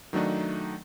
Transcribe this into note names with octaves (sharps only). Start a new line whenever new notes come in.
D#3 F#3 A3 D4 D#4